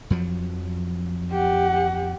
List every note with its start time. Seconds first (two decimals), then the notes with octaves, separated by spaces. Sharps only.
0.10 F2 F3 F#3
1.31 G4 F#5